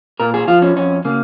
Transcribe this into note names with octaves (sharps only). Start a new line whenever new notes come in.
A#2 A#4
G#4
F3 F4
C#4
F2 C#4
C#3 A#3